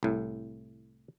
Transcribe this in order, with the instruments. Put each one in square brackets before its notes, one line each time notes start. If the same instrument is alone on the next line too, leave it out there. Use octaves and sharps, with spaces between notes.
[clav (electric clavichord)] C2 A2